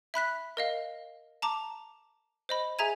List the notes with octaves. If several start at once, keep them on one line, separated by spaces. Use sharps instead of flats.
E5 B5 F#6 B6
A#4 D#5 F5
A5 A#5 D6
C5 D#5 B5
G#4 E5 G#5 A#5 G#6 D#7